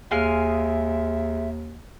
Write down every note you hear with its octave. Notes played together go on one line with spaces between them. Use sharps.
D#2 G#3 E5 F5 G#5